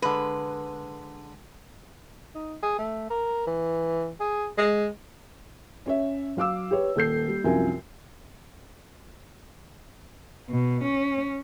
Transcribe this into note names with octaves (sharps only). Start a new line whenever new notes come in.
D3 G#3 B4
D#4
G#4
A3
A#4
E3
G#4
G#3
C#4 C#5 E5
F#3 F5 D6 E6
G4 B4 C#5
D#1 A4 G6 C7
G3
C2 F#2 F3 A#4 G#5
B2
C#4